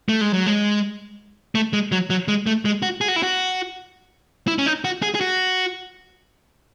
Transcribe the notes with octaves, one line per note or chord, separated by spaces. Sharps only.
A3
G#3
F#3
G#3
A3
G#3
F#3
F#3
G#3
A3
G#3
F#4
G#4
F#4
E4
F#4
E4
C#4
D#4
F#4
G#4
G#4
F#4